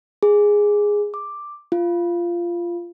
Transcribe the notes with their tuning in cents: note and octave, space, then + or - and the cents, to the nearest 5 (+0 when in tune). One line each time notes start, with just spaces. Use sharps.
G#4 -5
D6 +5
F4 -15